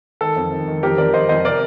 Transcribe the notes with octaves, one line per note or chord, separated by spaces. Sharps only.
D#3 A4
F2
D#3
D#3
F2 G4 A#4
F2 A#4 D5
F2 C5 D#5
F2 C5 D#5
C3 A#4 D5